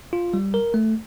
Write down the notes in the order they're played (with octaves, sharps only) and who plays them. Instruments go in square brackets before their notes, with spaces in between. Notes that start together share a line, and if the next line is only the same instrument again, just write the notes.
[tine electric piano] F4
G3
A#4
A3